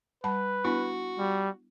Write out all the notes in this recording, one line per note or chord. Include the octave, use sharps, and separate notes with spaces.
G3 B4 A5 B5
B3 D4 E4 F#4
G3